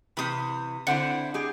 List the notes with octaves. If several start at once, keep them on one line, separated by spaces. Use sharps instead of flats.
C3 E3 B5 D#6
D3 C4 E4 F#5
G#3 G4 G#4